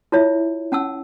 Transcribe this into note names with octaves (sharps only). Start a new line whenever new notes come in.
E4 F4 C#5 E5
C#4 F#5 A5 E6